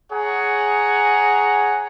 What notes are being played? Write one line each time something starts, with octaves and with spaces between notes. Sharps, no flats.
G#4 C#5 F#5 G#5 A#5